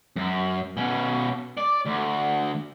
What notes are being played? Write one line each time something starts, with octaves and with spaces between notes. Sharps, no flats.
F#2
B2 C#4
D5
D2